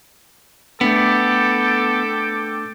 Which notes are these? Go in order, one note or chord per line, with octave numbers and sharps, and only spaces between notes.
A3 B3 D4 A4 G5 D6